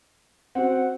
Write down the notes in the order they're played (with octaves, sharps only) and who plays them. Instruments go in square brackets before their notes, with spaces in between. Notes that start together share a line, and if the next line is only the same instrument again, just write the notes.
[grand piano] C4 F#4 [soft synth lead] F#5